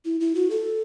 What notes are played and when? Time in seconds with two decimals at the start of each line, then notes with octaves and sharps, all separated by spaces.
0.05 E4
0.20 E4
0.35 F#4
0.50 A4